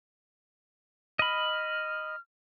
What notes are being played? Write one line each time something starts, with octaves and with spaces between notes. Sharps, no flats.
D#5 B5 F6